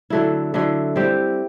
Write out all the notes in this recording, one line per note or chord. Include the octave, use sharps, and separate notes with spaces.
D3 F#3 A3 E4
D3 F#3 A3 E4
G3 C4 E4 G4